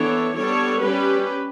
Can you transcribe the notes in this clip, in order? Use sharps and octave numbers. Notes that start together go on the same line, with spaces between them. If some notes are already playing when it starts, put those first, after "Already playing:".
Already playing: E3 B3 D4 A4 C#5
G3 B3 D4 A4 C#5
G3 C#4 G4 B4